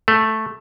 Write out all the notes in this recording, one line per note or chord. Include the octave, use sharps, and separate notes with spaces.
A3